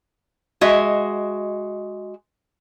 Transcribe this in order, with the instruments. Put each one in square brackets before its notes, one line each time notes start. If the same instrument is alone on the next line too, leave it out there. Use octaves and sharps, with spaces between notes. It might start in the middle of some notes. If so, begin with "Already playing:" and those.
[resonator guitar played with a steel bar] G#3 F#4 D#5 E5